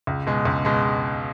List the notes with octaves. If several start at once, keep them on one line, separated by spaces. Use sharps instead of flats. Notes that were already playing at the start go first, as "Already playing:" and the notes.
C#2
B2 G#3
C#2
B2 G#3